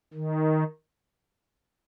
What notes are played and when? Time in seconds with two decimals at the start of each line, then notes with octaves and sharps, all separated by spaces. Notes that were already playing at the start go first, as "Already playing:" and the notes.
0.14 D#3